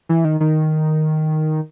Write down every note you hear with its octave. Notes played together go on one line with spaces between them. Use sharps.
E3
D#3
D#3